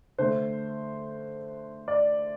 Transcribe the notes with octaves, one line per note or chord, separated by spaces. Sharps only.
D3 A3 C5
D5